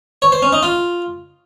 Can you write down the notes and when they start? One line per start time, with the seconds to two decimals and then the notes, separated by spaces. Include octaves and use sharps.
0.22 C#5
0.32 C5
0.42 C#4
0.53 D#4
0.63 F4